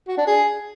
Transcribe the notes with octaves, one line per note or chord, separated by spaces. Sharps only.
F#4
D4
G#4